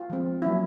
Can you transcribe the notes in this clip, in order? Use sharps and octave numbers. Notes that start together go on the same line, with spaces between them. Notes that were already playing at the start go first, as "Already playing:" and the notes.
Already playing: F4
F3 G#3 C4
F#3 A#3 C#4 E4